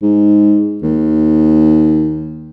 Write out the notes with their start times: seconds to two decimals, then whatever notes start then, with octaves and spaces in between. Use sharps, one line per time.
0.02 G#2
0.82 D#2